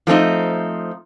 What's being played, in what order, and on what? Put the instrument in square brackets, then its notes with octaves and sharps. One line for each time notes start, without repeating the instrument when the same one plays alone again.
[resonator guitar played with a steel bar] F3 A3 C4 D#4